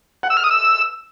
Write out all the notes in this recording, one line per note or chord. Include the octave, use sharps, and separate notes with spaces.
F#5
E6
F6
D#6
E6